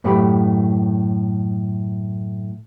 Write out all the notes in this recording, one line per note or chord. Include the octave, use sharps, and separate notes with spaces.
F#2 A2 A3 F#4 G4 B5